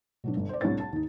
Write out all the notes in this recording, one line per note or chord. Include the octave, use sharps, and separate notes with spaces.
B2 F#3 D4
G1
C5 D5
C2 A2 D4 C#5 A6
A5
D#2 D#4